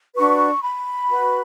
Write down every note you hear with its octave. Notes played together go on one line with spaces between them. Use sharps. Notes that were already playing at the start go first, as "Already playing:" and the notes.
D4 F#4 B4 C#6
B5
F#4 B4